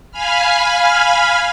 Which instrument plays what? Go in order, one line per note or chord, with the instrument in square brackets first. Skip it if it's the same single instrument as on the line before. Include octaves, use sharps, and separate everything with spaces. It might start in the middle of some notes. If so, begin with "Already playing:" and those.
[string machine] F5 G#5 B5 F6